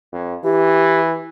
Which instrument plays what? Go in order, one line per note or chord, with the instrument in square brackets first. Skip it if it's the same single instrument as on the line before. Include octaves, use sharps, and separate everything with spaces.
[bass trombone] F2
[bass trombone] E3 [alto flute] G4